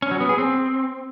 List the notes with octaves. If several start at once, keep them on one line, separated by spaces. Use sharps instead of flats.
C#4
F#3
B3
G#4
C4